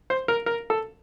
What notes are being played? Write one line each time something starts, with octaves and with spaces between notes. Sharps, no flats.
C5
A#4
A#4
A4